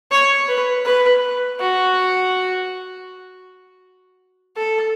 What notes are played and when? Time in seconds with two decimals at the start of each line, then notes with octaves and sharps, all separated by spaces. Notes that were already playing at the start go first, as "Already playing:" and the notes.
0.11 C#5
0.48 B4
0.85 B4
1.60 F#4
4.57 A4